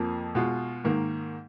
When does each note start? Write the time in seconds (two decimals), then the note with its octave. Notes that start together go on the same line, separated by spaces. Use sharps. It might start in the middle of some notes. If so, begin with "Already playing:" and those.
Already playing: F2 F3 A#3
0.35 B2 G#3 B3 F4
0.84 G#2 D#3 A#3